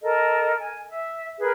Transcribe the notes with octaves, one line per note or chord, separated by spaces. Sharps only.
A4 A#4 D#5
G#5
E5
G#4 A#4 B4